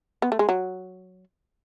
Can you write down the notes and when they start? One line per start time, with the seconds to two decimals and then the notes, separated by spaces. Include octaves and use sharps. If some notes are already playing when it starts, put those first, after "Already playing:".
0.22 B3
0.32 A3
0.39 G#3
0.49 F#3